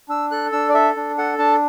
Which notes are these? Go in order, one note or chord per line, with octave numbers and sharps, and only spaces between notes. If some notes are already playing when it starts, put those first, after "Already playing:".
D4 E6
A4 F#6
D4 E6
D5
A4 E5
D4
A4 F#5
D4 A5